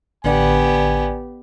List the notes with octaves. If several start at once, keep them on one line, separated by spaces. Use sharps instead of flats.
A1 D3 B3 G4 D5 G#5